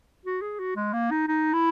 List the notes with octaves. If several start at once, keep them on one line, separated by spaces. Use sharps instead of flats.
F#4
G#4
F#4
G#3
A#3
D#4
D#4
E4